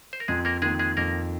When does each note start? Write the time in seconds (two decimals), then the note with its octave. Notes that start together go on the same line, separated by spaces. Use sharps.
0.13 C5
0.20 A#4
0.28 F2 G#3 G#4
0.45 A#3 A#4
0.62 D#3 G#3 A#3 G#4
0.79 G#3 G#4
0.97 F2 A#3 A#4